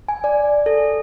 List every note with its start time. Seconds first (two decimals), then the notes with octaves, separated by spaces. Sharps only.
0.08 G#5
0.24 D5
0.66 A4